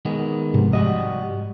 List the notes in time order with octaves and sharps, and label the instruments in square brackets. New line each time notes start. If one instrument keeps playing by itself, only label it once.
[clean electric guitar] D#3 G#3 B3
[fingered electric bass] G#2 [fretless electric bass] C3 F3
[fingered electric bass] G#2 [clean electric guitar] G3 F#4 D#5